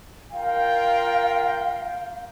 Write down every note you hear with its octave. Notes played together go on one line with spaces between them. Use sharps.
F4 A#4 F5 G5